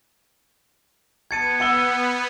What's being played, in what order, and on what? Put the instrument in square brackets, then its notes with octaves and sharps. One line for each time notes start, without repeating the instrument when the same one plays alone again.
[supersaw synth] B3 [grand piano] A5 A6 [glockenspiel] G#6 C#7 D#7
[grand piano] F#5 E6 G7 [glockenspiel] C#7